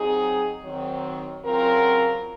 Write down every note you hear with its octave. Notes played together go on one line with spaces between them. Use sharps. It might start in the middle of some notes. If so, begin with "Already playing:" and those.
Already playing: F#3 C4 D#4 G#4
D#3 F#3 C4
C#3 F#3 C4 F4 A#4